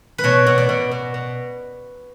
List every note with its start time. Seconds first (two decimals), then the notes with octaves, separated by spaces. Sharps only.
0.18 B4
0.24 B2 C#5
0.47 B2
0.58 D5
0.69 B2
0.91 B2
1.14 B2